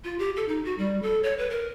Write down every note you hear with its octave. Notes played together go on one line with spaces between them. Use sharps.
F4
G4
A4
D#4
F#4
G3
A4
C#5
B4
A#4